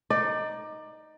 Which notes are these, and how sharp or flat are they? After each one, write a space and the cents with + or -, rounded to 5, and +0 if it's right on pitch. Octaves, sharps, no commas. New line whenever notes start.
D#4 +0 D5 +20